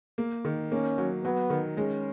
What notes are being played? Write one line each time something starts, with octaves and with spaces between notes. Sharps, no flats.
A#3
D#3
A#3 C#4
F#3
F#3 B3
D#3
G#3 C#4